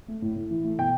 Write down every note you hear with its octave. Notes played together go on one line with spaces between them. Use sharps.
A3
A2
A2
E3
A3
B2 G5